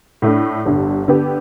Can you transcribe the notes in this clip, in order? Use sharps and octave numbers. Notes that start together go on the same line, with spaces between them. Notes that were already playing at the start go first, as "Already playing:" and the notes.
A2 A3 D4
G1 G2 D3
D3 B3 G4